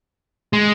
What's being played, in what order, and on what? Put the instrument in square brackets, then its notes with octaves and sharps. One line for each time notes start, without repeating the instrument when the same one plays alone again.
[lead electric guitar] G#3